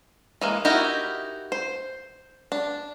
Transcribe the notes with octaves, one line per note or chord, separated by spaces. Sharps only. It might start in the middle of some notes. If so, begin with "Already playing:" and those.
E3 G#3 A#3
D#4 E4 F#4 G4 A#4
C5
D4